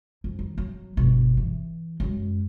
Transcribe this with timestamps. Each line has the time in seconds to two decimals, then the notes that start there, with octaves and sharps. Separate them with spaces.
0.24 F2
0.39 D#3
0.58 F#3
0.97 G1 B2
1.37 E3
2.00 F#2 G#3